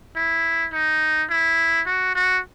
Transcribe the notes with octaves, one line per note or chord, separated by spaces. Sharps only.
E4
D#4
E4
F#4
F#4